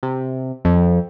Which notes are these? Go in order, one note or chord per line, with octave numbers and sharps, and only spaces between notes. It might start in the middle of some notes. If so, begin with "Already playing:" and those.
C3
F2